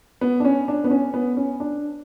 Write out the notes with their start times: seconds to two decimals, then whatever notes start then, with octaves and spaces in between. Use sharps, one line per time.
0.21 B3
0.40 D4
0.45 C#4
0.68 D4
0.84 B3
0.91 C#4
1.14 B3
1.37 C#4
1.60 D4